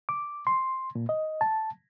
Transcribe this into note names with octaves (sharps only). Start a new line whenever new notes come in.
D6
C6
A#2
D#5
A5